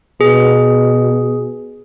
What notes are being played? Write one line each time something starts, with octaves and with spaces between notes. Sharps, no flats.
B2 G#4